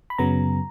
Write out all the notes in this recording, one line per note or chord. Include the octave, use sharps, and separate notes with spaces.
B5
F#2 C#3 F#3 B3 A#5